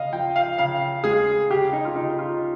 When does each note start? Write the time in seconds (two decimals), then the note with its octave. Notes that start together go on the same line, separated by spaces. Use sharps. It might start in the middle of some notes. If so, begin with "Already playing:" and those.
Already playing: C#3 D#5 F5
0.12 F3 G5
0.36 F5
0.58 C#3 F5
1.04 G#3 G#4
1.50 C#3 G4
1.73 D#4
1.85 F4
1.95 C#3 D#4
2.19 F4